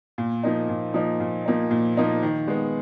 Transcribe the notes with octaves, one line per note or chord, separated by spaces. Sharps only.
A#2
F3 A#3 D#4
A#2
F3 A#3 D#4
A#2
F3 A#3 D#4
A#2
F3 A#3 D#4
D#3
G#3 B3